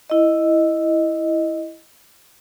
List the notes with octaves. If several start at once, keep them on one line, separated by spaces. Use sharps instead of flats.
E4 D#5